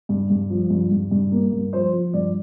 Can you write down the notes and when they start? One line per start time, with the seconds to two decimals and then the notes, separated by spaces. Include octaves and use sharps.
0.09 G2
0.30 G2
0.50 F3
0.70 G2
0.91 G2
1.11 G2
1.32 A#3
1.52 G2
1.73 F3 C5
1.93 F3
2.13 G2 D5